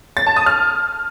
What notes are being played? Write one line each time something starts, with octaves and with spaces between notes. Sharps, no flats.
A6
A5
D#6
F6